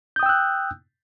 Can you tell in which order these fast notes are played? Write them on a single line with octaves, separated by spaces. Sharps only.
G6 D#6 G5 E6 F#6